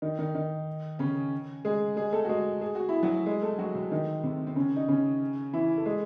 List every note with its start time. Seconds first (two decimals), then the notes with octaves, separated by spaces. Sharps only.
0.02 D#3 D#4
0.19 D#3 D#4
0.35 D#3 D#4
0.99 C#3 C#4
1.65 G#3 G#4
1.96 G#3 G#4
2.13 A3 A4
2.25 F#4
2.29 G#3 G#4
2.61 G#4
2.75 F#4
2.89 E4
3.03 F#3 F#4
3.26 G#3 G#4
3.43 A3 A4
3.58 F#3 F#4
3.75 C3 C4
3.91 D#3 D#4
4.23 C3 C4
4.47 C4
4.56 C#3 C#4
4.76 D#4
4.88 C#3 C#4
5.53 E3 E4
5.77 A4
5.85 G#3 G#4